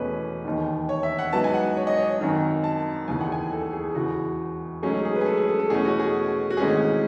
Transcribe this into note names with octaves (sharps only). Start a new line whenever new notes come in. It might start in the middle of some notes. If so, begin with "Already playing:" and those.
Already playing: E1 E2 B2 A3 C#4 B4 C#5
E1 D#2 D#3
C#5
E5
F#5
G#2 F#3 B3 A5
G#5
F#5
C#5
D#5
C#5
G#1 F#2 D#3
A5
E1 D#2 C#3 E3 G#5
F#5
G#5
A4
G#4
E1 E2 C#3 F#4
G#2 F#3 A3 C#4 G#4
G#4
G#4
B4
G#4
A4
G#4
A4
A4
E2 B2 A3 C#4 G#4
F#4
G#4
F#4
G#1 G#2 E3 A3 C#4 G#4